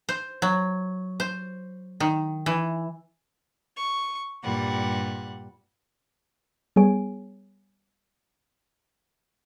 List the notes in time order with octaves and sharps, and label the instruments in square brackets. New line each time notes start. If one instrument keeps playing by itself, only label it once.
[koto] C5
F#3
C5
D#3
E3
[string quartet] C#6
G2 A#2 G3 F#5
[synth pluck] G3 B3 G#4 C#5 G#5 D7